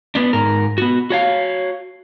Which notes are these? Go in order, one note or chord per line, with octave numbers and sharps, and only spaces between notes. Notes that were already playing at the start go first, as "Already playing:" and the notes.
B3 D4
G#2 A#4
B3 F#4
F#4 C#5 F5